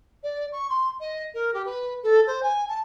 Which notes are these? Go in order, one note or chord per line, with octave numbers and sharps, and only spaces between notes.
D5
C#6
C6
D#5
A#4
G4
B4
A4
C5
G#5
A5